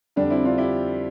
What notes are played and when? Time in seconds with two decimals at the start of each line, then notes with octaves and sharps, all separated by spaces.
0.16 F2 D3 G3 D4
0.30 C4 E4
0.45 D4 F4
0.58 E4 G4